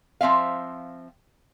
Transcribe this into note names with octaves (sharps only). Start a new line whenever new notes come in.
F3 C4 E5 F5